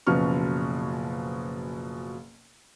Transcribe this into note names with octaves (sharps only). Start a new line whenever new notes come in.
F#1 B2 F3 C#4 C#6 F6